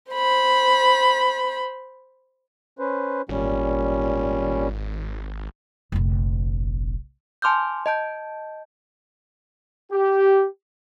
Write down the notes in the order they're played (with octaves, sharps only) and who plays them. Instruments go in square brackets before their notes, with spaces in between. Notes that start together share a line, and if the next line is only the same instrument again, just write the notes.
[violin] C5 B5
[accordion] C#4 B4 C5
[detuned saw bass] G#1 [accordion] A#2 G3 C#4
[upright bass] F1 A#1
[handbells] G#5 A5 C6 D6 F6 G6
D#5 A5 G6
[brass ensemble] G4